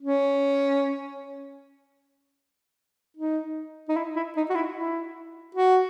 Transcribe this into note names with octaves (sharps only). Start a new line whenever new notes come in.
C#4
D#4
D#4
E4
E4
D#4
F#4
E4
E4
F#4